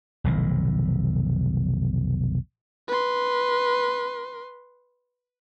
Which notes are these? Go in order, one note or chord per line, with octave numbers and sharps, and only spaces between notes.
F1 B1 A2 D#3
B4 C6